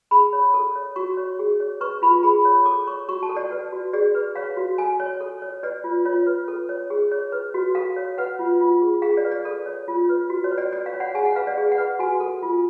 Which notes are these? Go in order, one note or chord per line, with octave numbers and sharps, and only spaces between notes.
G#4 B5
C#5
A4
C#5
F#4 C#6
C#5
G#4
C#5
B4 C#6
F4 B5
G#4 B5
C#5
A4 D6
C#5 C#6
F#4 C#6
A5
A4
D5
B4 D5
F#4
G#4 D5
B4
C#5 F5
F#4
A4 G#5
C#5
A4
C#5
B4 D5
F4
F4 C#5
B4
A4
C#5
G#4
C#5
B4
F#4
A4 F5
C#5
B4 F#5
F4
F4
G#4
G#4 F5
D5
B4
D5
A4
C#5
F4
B4
F#4
C#5
B4
D5
A4 D5
F5
C#5
F#5
G#4 G#5
F#5
B4 F5
D5
G#4
F#5
B4
F#4 G#5
A4
F4